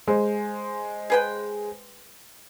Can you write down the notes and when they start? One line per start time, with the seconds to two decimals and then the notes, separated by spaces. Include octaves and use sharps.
0.08 G#3 C5
1.10 G#4 B4 G5